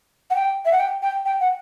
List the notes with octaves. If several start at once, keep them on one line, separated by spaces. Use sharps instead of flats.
F#5
G5
E5
F#5
G5
G5
G5
F#5